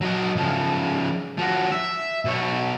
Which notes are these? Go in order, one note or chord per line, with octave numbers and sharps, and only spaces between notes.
F#3 D#5
C#3 F3
F3 F#4
E5
B2 C#5